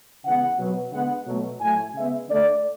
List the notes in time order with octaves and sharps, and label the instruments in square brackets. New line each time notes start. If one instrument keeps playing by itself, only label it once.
[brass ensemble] C#3 E3 G#3 B3 F#5
B2 F#3 B3
D3 G#3 B3 F#5
B2 F#3 A3
A2 F#3 A3 G#5
C#3 G#3 B3 E5
D3 A3 D5